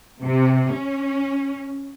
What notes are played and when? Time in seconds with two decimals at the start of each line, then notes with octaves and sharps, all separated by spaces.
0.22 C3
0.72 C#4